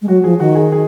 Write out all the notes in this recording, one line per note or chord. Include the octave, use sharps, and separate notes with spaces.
G#3
F#3 F#4
F3 G#4
D#3 F#4
G#4
G#4